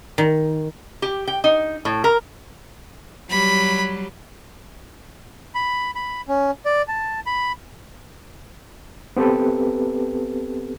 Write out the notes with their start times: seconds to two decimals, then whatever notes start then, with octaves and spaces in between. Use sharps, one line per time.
0.18 D#3
1.02 G4
1.28 G5
1.44 D#4
1.85 A2
2.04 A#4
3.30 F#3 G3 B5
5.55 B5
5.95 B5
6.28 C#4
6.66 D5
6.88 A5
7.26 B5
9.17 B3 C4 G4 A4 B4